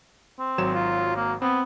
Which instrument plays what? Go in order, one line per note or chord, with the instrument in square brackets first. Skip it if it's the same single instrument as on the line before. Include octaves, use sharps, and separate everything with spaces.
[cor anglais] C4
[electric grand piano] G#1 F#3 E7
[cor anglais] F4
A#3
[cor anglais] B3 [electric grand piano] C4